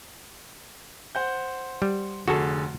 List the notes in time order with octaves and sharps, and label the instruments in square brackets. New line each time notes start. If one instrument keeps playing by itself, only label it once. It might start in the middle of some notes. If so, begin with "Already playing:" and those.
[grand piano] C5 F#5 G6
[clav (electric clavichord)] G3
[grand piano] F1 D3 G#4 [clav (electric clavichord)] F#4 A4